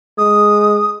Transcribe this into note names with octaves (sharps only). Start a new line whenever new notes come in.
G#3 D#6